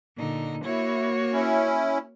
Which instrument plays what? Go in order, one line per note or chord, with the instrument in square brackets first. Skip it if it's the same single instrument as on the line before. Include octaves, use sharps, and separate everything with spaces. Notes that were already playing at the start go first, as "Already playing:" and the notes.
[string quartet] A#2 D3 D#4
[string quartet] A#3 F#4 C#5 [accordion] E4
[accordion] C#4 E4